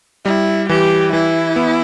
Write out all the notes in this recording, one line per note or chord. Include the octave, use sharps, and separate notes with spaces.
G3 E4
E3 G4
E3 E4
B3